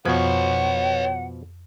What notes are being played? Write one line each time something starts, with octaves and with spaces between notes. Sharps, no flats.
F2 B2 F3 B4 C#5 F#5 D#6